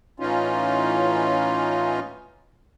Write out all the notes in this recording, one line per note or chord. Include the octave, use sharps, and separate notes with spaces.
A2 E3 C#4 D#4 F4